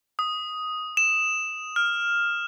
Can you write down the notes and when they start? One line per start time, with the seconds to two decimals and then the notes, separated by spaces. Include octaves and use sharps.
0.19 D#6
0.97 E7
1.76 F6